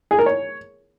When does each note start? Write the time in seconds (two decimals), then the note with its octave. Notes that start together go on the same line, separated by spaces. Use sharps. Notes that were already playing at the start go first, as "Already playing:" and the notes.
0.11 G#4
0.19 A#4
0.26 C#5